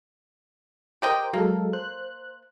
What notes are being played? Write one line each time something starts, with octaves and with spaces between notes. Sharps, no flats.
G4 A#4 C5 D#5 G5 D6
F#3 G#3 A#3 A4
C5 F#6